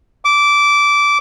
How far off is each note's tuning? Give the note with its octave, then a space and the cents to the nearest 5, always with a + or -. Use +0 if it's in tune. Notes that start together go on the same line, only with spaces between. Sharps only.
D6 -15